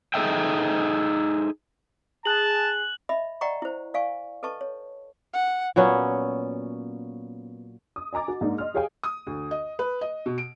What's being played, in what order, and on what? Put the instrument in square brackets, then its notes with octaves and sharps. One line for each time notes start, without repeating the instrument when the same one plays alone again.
[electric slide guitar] D#4 G#4 A4 D#5 E5 G5
[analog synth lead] G#4 [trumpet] A5 [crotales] F#6 F#7
[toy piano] D#5 E5 B5
D5 D#5 F#5 G5 A#5 C#6
E4 C5
D5 F5 G#5 C#6
A4 B4 D#5 A5 C#6
C#5
[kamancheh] F#5
[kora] A#2 F#3 B3 C#4
[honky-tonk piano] D#6
D#5 G#5 A#5 D6 A6
F#4
G#2 A#3 D4 D#4
D#5 C6 F6
G4 G#4 C#5 F5 G5 G#5
[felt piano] D#6
D2
D#5
B4
D#5
B2
D7